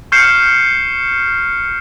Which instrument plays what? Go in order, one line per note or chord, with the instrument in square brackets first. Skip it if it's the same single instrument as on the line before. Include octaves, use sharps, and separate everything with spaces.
[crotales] C#6 F6 G6 C7 C#7 E7